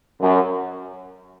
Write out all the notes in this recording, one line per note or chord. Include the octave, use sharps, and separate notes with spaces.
F#2